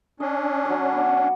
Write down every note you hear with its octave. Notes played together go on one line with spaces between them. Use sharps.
C#4 D4 D#5
F#3 C#5 D5
B3 D5